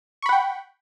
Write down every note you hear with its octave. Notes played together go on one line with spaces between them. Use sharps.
F#5 G5 B5 C#6